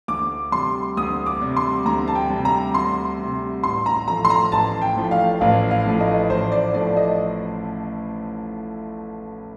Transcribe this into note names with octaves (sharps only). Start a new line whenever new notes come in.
D2 D6
C3 G3 C6
D2 D#6
D6
C3 G3
C6
D2 A#5
A5
G5
C3 G3
A#5
D2 C6
C3 G3
A1 C6
A#5
A2 F3 A3 A#5
C6
A#5
A1 A5
G5
A2 F3 A3
F5
A1 F5
F5
A2 F3 A3
D#5
A1 C5
D5
A2 F3 A3 D5
D#5